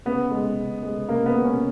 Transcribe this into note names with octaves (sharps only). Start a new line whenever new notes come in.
C#3 B3
G#3
C#3
G#3
C#3 A#3
B3
G#3
C#4